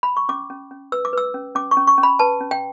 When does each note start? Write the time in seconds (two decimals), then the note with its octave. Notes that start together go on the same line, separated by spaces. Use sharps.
0.03 B5
0.17 C#6
0.29 C#4 D6
0.50 C#4
0.71 C#4
0.92 B4 E6
1.05 D6
1.13 B4 E6
1.34 C#4
1.55 C#4 D6
1.71 C#6
1.77 C#4
1.87 C#6
1.98 C#4
2.03 B5
2.19 B4 A5
2.40 C#4
2.51 G5